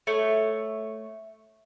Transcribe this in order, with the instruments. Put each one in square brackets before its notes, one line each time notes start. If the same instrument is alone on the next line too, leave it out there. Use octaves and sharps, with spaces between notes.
[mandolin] A3 C#5